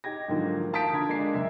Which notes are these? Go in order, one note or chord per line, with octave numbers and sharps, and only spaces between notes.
D#4 G4 G#6 A#6
G#2 D3 D#3 F3 F#3 A#3
F5 A5 D#6 G6 B6 D7
D3 F4 A#5 G#6
G#3 A#3 D4 G#5 C7
F#1 E5